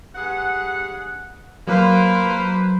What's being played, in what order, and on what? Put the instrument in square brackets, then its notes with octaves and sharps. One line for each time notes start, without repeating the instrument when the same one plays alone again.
[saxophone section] G2 G#4 F#5
[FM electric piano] F#3 [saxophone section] A#3 [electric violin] B4 C5